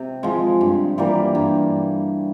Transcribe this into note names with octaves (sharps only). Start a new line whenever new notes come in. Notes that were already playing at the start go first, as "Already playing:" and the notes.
Already playing: C3
F3 G#3
G2
E3 G3 A#3
G2